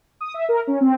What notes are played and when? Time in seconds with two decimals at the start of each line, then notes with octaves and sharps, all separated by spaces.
0.21 D#6
0.34 E5
0.49 A#4
0.67 C#4
0.81 C4